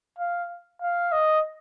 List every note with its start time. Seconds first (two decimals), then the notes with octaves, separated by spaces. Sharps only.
0.18 F5
0.82 F5
1.12 D#5